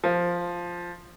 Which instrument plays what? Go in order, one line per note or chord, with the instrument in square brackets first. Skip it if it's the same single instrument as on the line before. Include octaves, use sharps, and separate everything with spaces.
[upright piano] F3